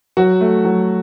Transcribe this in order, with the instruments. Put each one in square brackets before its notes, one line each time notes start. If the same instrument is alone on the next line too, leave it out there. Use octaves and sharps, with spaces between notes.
[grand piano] F#3 F#4
A3
F#3